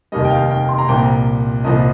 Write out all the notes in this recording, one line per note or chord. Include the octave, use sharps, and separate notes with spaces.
F1 D#2 D#3 G3 D#5
G5
F5
G5
C6
A#5
C2 A#2 F3 G5
A#5
C2 A#2 F3 D#5